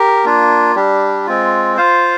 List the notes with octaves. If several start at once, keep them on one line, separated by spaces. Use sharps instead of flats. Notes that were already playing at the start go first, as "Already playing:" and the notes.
Already playing: G4 A#4
A#3 D4 F4
G3 D4 G4
G#3 C4 F4
F4 C5 F5